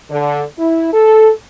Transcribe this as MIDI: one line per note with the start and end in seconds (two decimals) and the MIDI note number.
0.10 0.43 50
0.59 0.89 64
0.93 1.31 69